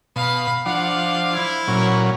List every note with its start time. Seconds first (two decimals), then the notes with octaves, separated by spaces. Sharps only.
0.16 B2 F5 B5
0.66 F3 D4 C5 F5 F#5
1.34 E4
1.68 A#2 F#3 C#4